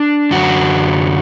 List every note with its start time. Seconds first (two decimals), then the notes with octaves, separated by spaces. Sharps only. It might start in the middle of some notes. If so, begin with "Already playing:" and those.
Already playing: D4
0.31 F#2 D3 F#4